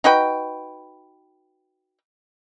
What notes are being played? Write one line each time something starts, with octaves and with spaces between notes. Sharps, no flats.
D#4 F#4 B4 G5